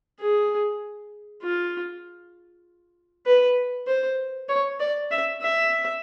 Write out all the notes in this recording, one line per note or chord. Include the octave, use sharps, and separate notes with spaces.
G#4
F4
B4
C5
C#5
D5
E5
E5